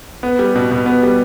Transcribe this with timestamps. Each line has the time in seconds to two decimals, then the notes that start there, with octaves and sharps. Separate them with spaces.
0.23 B3
0.39 G3
0.55 B2
0.71 B2
0.86 B3
1.03 G3